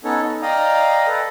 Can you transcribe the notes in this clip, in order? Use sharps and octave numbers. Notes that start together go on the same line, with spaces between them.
B3 C#4 D#4 A4 C#5
D#4
D5 D#5 F5 G5 A#5 D#6
A4 B4